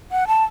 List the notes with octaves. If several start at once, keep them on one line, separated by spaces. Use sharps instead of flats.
F#5
A5